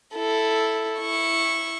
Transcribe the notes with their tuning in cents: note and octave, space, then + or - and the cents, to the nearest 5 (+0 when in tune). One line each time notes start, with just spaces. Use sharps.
E4 +0 A4 +0
E4 +0 C#6 -15